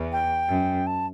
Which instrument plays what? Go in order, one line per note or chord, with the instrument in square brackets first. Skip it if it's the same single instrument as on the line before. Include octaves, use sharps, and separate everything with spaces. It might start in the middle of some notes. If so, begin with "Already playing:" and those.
Already playing: [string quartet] E2
[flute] G5
[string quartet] F#2
[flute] A5